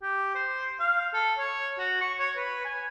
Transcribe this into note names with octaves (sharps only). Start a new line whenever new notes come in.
G4
C5
F5
A4
C#5
F#4
C#6
C#5
B4
G#5